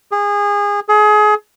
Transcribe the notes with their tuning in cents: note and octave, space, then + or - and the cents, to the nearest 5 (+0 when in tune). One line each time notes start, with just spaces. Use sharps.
G#4 -25
G#4 +30